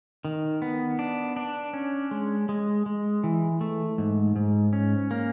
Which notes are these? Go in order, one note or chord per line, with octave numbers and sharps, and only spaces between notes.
D#3
B3
D4
D4
C#4
G#3
G#3
G#3
E3
A3
G#2
G#2
C#4
A#3